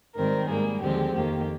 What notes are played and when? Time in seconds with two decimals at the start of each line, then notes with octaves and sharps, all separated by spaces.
0.16 G#2 D#3 G3 C4 A#4
0.48 G#2 G3 A#3 G#4
0.81 D#2 D3 F3 G#3 C4 G4
1.14 F2 D#3 A#3 G4